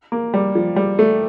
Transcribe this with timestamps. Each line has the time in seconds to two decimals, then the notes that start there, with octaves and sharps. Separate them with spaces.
0.12 A#3
0.34 G3
0.55 F3
0.76 G3
0.99 A3